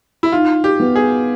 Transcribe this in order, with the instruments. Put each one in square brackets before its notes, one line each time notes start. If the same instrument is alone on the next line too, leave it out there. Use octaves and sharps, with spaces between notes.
[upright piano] E4
[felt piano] D#4 [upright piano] F4
[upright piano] G4
[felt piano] B3
[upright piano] G#4